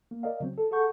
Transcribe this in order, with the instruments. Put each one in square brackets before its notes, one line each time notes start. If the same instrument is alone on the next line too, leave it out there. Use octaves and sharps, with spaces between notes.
[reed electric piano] A#3
A#4 D5 D#5 F5
C#3 F#3 C4
A4
G#4 A4 F#5 C#6 G6